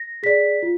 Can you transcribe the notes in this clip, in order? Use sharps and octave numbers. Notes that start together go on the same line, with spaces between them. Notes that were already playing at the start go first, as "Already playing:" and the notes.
Already playing: A#6
G#4 D5 B6
F4